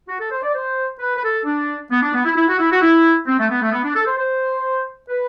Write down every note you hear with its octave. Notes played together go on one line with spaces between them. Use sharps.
F#4
A4
C5
D5
C5
B4
B4
A4
D4
B3
D4
B3
E4
E4
F#4
E4
F#4
E4
C4
A3
B3
A3
B3
D4
A4
C5
C5
B4